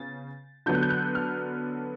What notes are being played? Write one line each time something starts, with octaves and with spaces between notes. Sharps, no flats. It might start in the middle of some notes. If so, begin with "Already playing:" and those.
Already playing: C#3 B3 A6
D3 F#3 B3 G6
F#6
G6
F#6
F6